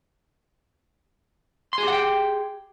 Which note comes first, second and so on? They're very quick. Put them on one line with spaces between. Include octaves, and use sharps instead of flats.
C6 G#4 G4 F#5 G5